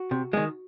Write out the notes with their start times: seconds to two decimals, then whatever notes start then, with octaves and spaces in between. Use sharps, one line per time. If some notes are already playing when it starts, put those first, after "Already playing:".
Already playing: F#4
0.11 C3
0.33 D#3 G#3